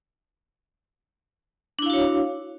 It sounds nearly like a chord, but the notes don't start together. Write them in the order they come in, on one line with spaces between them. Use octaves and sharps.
D4 E4 F5 F#4 C#5